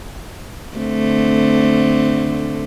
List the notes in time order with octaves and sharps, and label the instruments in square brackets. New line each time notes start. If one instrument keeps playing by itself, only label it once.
[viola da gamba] D3 A3 C4